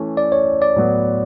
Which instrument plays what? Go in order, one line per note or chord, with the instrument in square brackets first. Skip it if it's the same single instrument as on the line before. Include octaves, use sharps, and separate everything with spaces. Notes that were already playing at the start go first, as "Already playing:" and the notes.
Already playing: [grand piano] E3 A3 C#4
[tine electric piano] D5
C#5
D5
[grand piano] A2 F#3 B3